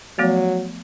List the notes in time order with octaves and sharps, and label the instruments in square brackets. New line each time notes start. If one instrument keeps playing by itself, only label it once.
[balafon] F3 A3 B3 [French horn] F#3